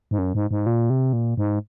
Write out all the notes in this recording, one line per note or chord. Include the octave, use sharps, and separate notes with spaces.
G#2
F#2
G#2
G#2
A#2
C3
A#2
G#2